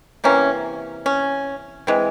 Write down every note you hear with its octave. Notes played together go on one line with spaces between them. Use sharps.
C3 E3 A#3 C#4
C#4
E3 G#3 C4